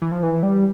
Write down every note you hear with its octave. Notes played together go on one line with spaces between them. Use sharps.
E3
F3
E3
G3